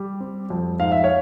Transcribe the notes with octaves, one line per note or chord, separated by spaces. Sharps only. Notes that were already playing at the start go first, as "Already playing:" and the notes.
Already playing: G3
C4
F2
G#2 F5
E5
C#5 F5